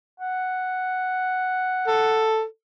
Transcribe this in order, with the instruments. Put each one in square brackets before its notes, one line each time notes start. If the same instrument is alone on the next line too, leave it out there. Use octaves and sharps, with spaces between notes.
[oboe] F#5
[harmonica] A4